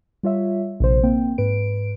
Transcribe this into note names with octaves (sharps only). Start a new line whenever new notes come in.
G3 F4 C#5 E5
A#1 C3 C5
A#3 C4 G5
G#2 B4 D7